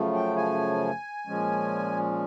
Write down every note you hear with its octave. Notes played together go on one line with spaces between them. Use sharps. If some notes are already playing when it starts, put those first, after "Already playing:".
Already playing: F#2 C#3 F3 A3
G5
G#5
A#2 F3 G#3 C#4